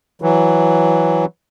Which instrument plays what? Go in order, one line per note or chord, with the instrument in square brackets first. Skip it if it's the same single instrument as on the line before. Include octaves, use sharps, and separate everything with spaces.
[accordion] E3 F#3